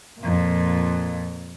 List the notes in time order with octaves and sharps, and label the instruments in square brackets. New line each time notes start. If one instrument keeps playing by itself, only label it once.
[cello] F2 A#2